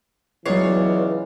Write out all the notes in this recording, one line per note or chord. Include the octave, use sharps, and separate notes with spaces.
C#2 E3 F#3 B3 D4 C#5 C7